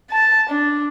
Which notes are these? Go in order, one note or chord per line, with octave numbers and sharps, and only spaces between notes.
A5
D4